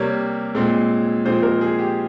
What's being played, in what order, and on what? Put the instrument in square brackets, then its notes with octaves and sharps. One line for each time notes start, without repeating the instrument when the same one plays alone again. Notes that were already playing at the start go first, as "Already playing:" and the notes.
Already playing: [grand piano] C3 G3 A#3 C#5
A#2 G#3 C4
A#2 F3 G#3 C4 C5
A#4
G#4
G4